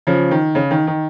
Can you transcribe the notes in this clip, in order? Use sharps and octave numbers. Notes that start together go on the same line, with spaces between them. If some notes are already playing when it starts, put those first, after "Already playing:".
C#3 F3
D#3
C#3
D#3
D#3